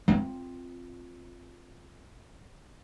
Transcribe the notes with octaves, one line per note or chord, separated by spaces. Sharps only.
C4 F4